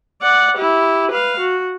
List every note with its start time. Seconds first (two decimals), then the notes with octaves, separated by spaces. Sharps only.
0.22 D5 F#5
0.57 E4 G4
1.11 B4 F5
1.40 F#4